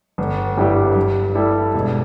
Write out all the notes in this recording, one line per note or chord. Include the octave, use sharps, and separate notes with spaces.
G1
G2 G3 E4 G4
G2
G3 E4 A4
E1